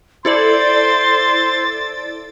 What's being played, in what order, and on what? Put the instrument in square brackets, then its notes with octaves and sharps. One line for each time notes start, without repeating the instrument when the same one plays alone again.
[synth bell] E4 A4 D5 [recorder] C5 [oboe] C6 [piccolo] A6